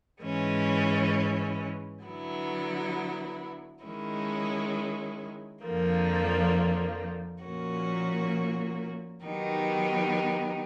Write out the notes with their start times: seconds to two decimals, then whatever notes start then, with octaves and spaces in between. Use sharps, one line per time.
0.22 G#2 E3 G#3 C#4
2.02 D3 F#3 B3 E4
3.83 D#3 G#3 C#4 E4
5.63 F2 D3 F3 A#3
7.43 A#2 F3 A#3 C#4 F#4
9.23 D#3 F#3 B3 D#4 G4